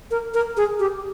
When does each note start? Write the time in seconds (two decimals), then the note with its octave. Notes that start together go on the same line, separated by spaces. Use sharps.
0.11 A#4
0.34 A#4
0.57 G#4
0.80 G4